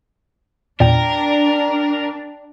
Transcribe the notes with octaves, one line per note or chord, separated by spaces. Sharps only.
E2 A#2 D4 A#4 D5 G5